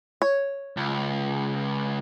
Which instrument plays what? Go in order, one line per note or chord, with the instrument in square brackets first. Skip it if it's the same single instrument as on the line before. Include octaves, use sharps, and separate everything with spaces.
[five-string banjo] C#5
[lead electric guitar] C#2